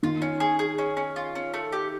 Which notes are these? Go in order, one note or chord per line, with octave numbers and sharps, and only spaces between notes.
D#3 F4
C#4
G#4
G#4
C#4
C#4
F4
C#4
A3
G4